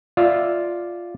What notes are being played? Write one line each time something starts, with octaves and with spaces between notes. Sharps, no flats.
F4 D5 E5